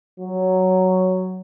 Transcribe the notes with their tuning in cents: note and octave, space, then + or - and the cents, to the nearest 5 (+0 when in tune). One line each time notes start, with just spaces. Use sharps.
F#3 +5